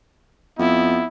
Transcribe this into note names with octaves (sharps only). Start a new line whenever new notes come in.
F2 B3 E4